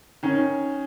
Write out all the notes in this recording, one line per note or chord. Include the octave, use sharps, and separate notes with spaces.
D#3 C#4